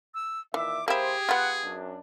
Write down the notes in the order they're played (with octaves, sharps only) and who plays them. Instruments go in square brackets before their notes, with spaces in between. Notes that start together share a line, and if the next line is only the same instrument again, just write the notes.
[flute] E6
[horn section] A#2 D#3 E5 [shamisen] E3 [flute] D6
[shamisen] A#3 E4 [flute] G4 [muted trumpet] G#4 [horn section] C5
[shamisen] B3 F4 [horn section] F#5
[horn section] F#2 D4